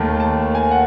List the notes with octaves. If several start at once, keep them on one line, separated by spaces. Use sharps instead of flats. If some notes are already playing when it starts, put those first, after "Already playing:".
Already playing: D#2 D#3 A3 A5
A5
G#5
F#5